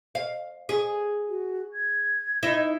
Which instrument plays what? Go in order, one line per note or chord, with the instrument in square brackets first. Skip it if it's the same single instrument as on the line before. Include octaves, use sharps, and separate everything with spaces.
[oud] F5
G#4
[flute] F#4
G#6
[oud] D#4 E4